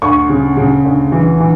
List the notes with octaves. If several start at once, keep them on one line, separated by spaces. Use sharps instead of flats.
D2 C#6
C#3
C#3
D2
E3
E3